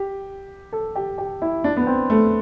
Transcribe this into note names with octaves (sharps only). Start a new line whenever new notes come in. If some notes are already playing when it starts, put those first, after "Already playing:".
Already playing: G4
A4
G4
G4
E4
D4
B3
C4
A3